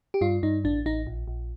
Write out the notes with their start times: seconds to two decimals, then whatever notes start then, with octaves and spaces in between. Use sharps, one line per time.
0.14 G4
0.21 G2 F4
0.43 G2 D#4
0.64 A1 D4
0.86 A1 D#4
1.07 A#1
1.28 A#1